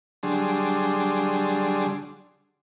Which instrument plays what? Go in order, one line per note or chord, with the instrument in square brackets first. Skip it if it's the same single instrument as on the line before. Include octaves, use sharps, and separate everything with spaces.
[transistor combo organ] D3 F#3 G3 D4 G#4 C6